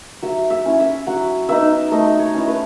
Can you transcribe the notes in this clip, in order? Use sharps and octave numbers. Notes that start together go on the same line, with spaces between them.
F#3 E5
E5
C#4 E4
E5
F#3 F#5
B3 D#4 E5
A3 D#5
C#5
C#4 E4
B4